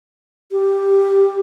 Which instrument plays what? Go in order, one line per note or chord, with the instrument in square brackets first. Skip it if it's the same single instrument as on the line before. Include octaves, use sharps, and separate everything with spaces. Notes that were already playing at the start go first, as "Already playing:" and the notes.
[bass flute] G4